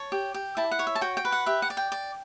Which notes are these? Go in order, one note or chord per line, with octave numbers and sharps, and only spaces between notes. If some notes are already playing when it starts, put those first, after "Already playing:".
Already playing: C#5 A5
G4
G4
E4 A5
F#5
C#5
E5
A5
F#4 G5
G5
B4
F#5
G4 E5
F#5
D5
G5
D5